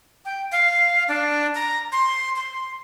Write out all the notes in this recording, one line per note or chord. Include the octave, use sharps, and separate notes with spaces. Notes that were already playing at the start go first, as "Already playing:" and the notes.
G5
F5
D4
A#5
C6
C6